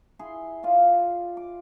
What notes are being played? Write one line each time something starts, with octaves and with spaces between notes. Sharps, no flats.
E4 G#4 C6
F4 D5 F5
D6